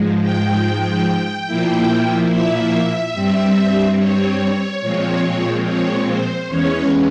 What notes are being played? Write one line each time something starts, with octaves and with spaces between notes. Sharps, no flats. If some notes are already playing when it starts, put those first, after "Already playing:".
Already playing: G#2 F3 G#3
G5
A#2 F3 A#3 E4
E5
G2 G3 C4
C#5
A#2 F3 G#3 C4
C#5
C5
E2 E3 G#3 C#4 C#5